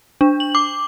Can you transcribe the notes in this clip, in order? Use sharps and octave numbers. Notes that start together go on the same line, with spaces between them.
D4
F#7
D6